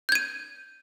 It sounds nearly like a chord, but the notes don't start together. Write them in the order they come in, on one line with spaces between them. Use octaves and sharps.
G6 G#6 D#7